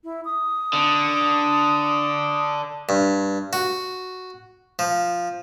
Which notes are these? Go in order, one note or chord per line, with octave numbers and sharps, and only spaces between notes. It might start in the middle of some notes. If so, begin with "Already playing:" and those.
E4
D#6
D3
G2
F#4
F3